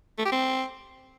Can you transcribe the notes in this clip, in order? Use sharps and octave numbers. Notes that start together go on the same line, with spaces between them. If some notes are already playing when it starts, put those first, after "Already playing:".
A3
G4
C4